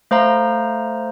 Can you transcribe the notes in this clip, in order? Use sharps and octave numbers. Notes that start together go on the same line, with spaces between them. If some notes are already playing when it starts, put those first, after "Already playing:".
A3 C5 F5 A#5